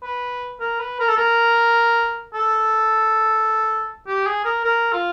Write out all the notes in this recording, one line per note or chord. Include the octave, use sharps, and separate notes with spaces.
B4
A#4
B4
A#4
A4
A#4
A4
G4
G#4
A#4
A#4
F4